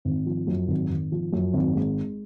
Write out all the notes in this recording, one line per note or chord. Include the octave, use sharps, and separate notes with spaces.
G#1
F3
F#2
G#1
G#1
F3
F#2
G#1
G#3